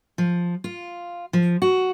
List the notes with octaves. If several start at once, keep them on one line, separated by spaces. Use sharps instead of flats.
F3
F4
F3
F#4